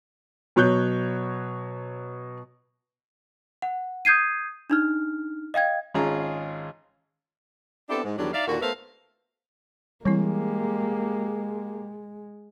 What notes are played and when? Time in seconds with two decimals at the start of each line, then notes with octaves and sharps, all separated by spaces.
0.56 B2 F#3 C#5 F#6 G6
3.62 F#5
4.05 D#6 G6 G#6 C7 D#7
4.70 D4 D#4 F6
5.54 D#5 F5 G5 G#6
5.94 G#1 C#4 F4 G#4 A#5
7.89 B3 C4 D4 E4 G4 A4
8.04 G#2
8.18 E2 D#3 F#3 G3 D4
8.33 D#4 D5 E5 F5
8.47 D#2 A#2 D3 F4 F#4
8.61 A3 B3 A#4 C5 E5 F5
10.05 E3 G3 G#3 A#3 C4 E4 G4